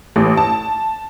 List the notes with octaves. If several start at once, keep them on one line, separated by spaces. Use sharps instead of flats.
A1
A5